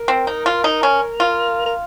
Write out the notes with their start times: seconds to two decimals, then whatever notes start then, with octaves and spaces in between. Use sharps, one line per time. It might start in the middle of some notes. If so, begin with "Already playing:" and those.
Already playing: A#4
0.08 C4
0.27 D#4
0.46 F4
0.64 D#4
0.83 C#4
1.20 F4
1.66 A#4